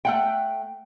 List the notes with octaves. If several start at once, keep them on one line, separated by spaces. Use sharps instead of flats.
A3 F#5 G5